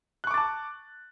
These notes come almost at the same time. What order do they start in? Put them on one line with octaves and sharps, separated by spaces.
F#6 C#6 D6 A6 A5